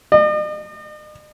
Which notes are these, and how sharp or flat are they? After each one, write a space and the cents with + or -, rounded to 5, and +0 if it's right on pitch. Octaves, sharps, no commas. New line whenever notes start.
D#5 -45